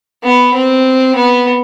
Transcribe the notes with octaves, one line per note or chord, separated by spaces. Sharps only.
B3
C4
B3